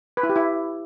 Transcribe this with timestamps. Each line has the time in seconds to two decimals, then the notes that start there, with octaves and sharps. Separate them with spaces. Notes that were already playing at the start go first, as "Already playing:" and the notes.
0.17 B4
0.23 E4
0.29 G4
0.36 E4